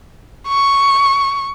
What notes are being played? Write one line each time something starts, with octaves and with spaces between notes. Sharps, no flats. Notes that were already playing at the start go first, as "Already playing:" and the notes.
C#6